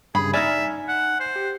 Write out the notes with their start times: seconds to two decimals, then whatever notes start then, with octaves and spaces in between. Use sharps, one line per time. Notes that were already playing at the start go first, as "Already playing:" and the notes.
0.15 G2 C#3 G#4 B5
0.34 D#4 D5 E5 G#5 F6 G#6
0.88 F#5
1.20 C5
1.36 G4